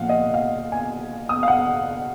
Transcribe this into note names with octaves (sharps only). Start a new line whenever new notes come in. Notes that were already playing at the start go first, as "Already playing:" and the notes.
Already playing: A#2 F3 F5 F#5
D#5
F5
G#5
D#6
F5
F#5